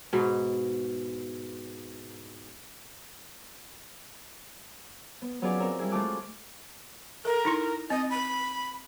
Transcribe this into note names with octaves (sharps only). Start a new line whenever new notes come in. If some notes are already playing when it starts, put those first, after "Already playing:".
G#2 B2
B3
F#3 B3 C#4 F4 G#4 D5
C4 A#4 C#5
G3 E4 G#4
G#3 A3 F4 A5 D6 F#6
A4 A#4
D#4 E4 C6
C4 D#5
B5